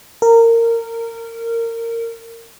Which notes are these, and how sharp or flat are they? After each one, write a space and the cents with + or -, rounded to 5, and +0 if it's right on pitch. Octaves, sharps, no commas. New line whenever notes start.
A#4 -20